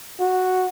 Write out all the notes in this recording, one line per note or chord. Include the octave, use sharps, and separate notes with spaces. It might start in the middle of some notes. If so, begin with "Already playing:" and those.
F#4